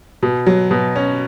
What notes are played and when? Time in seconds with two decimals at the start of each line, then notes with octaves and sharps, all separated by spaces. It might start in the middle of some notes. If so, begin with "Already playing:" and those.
0.23 B2
0.46 F#3
0.71 B2
0.96 C#4